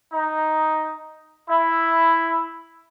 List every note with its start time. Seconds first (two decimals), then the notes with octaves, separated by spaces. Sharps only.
0.11 D#4
1.49 E4